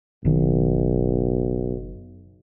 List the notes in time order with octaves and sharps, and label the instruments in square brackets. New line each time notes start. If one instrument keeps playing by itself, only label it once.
[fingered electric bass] F#1 D#3 [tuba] B1